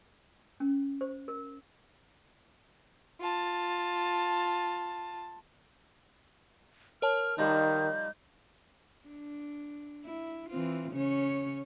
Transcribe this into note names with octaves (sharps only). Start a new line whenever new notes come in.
C#4
C5
A#4
F4 A5
A#4 C#5 A5 F6
D#3 F3 G3 D#4 G6
D4
E4
E3 C4 F4
C#3 C#4 C#5